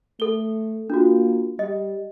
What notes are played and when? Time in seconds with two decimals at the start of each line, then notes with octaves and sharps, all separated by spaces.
0.20 A3 A4 G7
0.90 A#3 D4 F4 F#4
1.59 G3 D#5